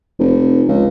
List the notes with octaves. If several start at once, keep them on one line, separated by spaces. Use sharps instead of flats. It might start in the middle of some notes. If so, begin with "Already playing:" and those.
F1
C#2